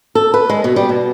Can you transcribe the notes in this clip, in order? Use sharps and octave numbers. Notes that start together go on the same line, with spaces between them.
A4
B4
G#3
B2
G3
B2